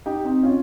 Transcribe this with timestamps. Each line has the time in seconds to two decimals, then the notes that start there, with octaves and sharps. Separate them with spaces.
0.06 D#4 G4
0.25 C4 D#4
0.43 C#4 F4